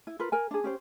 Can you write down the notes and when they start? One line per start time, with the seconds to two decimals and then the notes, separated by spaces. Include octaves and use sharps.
0.07 E4
0.19 F4 A#4 B4
0.32 A#4 G#5
0.51 D4 G#4
0.64 C#4 G4 C5